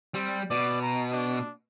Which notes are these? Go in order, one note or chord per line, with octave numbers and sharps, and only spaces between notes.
G3 C4
B2 D5
A#5
D4